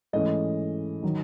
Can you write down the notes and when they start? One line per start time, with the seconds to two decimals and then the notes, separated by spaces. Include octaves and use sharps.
0.13 G#2 E3 A3 C#4 D#5
1.03 D#3 F#3